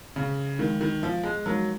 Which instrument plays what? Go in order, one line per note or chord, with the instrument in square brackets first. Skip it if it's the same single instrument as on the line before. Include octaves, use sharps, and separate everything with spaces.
[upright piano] C#3
[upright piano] D#3 [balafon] F3 G#3 D#4 A#4
[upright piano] D#3
F3
G#3
[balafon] F3 G#3 D#4 A#4 [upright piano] F#3